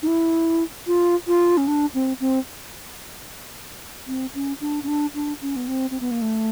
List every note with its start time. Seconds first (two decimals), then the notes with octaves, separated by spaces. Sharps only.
0.03 D#4
0.07 E4
0.87 F4
1.27 F4
1.57 C#4
1.67 D4
1.94 C4
2.20 C4
4.08 C4
4.35 C#4
4.61 D4
4.83 C#4
4.88 D4
5.15 D4
5.41 C#4
5.56 B3
5.68 C4
5.91 C4
6.00 B3
6.11 A#3
6.22 A3